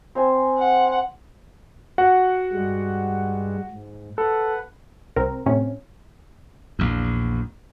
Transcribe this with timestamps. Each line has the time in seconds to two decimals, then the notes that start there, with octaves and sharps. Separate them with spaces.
0.15 C4 C5 G#5
0.58 F#5
1.98 F#4 F#5
2.53 G2 G3 G#3
3.71 G#2
4.18 A4 B4 F#5
5.16 C2 C4 A#4
5.46 A2 C3 C#4
6.79 A#1 E2